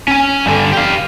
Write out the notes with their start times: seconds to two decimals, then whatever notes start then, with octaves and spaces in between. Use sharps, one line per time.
0.08 C#4 G#5
0.46 G2 D3
0.73 G4 F5